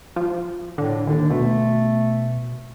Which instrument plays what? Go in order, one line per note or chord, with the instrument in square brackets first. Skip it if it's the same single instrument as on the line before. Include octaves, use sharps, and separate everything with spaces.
[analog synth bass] F3
[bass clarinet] A2 [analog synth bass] D3
[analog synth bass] D#2 [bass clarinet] D3
[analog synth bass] B2 [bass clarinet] A3